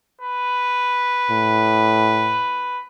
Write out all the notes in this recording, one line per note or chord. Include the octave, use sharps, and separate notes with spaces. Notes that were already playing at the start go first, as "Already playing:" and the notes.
B4
A2